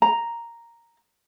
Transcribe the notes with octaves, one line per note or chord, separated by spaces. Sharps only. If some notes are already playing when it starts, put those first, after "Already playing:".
A#5